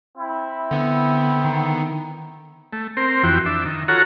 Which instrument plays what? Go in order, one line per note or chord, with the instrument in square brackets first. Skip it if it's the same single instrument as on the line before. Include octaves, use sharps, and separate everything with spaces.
[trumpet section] C4 E4
[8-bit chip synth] D3 B3
[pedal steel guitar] D#3
[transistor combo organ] A3
C4 A#4 C5
F2 E3 F#4 G5
D4 E5
D#3
F4 F#4 A4 C#5 F#5 A#5